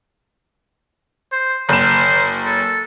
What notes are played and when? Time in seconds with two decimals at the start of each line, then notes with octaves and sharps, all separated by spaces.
1.32 C5
1.69 F#1 C5 E7
2.46 A4